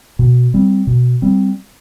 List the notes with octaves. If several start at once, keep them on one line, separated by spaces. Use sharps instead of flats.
B2
G3 C4
B2
G3 C4